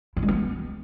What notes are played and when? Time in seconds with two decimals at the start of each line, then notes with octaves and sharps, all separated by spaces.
0.17 E4
0.22 G#3
0.28 B3